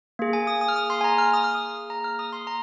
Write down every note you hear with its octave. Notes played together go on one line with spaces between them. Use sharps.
A#3 G#4
G#5
D#6
D#6
F6
D#6
C6
G#5
A#5
F6
D#6
F6
D#6
A#5
F6
D#6
C6
A#5